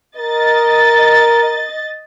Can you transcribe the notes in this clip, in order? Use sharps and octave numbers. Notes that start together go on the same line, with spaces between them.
A#4 D#5 A6